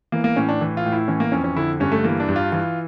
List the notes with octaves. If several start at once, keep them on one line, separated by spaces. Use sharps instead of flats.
E3 A#3
A#3
A2 C#4
D4
E3
F4
A2
E4
E3 C#4
A#3
F2 C#4
C#4
D3 E4
G2 C#4
A3
E3 A#3
D4
G2
F4
E3 F4